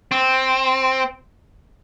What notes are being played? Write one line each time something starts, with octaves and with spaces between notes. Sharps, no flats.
C4